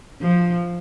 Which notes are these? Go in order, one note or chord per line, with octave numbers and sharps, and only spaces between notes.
F3